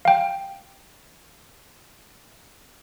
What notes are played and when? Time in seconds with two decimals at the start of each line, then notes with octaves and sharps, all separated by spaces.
0.05 F5 G5